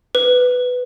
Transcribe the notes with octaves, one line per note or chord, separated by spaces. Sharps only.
B4